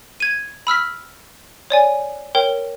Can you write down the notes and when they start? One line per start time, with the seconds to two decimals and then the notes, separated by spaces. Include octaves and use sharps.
0.20 G#6 D#7
0.67 B5 E6 F6 B6
1.70 C#5 D5 G#5
2.35 A#4 C#5 G5